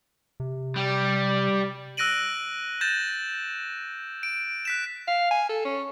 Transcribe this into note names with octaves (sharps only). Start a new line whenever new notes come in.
C3
G3
E6 F#6 A#6 D7 D#7 F#7
G6 A6 A#6 E7
D7
F#6 B6 E7
F5
G#5
A4
C#4